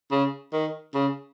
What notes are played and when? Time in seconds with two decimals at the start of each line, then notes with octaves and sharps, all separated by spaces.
0.12 C#3
0.53 D#3
0.94 C#3